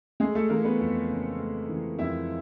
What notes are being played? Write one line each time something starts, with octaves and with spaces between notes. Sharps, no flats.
G#3 A3 G#4
A3 A4
E3 A#3 A#4
B3 B4
F2
C#3
A3
E3
F2 E4 E5